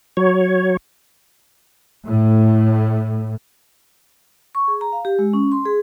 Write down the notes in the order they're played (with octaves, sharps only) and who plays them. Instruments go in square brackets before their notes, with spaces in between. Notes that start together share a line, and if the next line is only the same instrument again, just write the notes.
[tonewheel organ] F#3 C#5
[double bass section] A2
[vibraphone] C#6
G#4
A#5
F5
G4
G#3
C#4
C6
G#4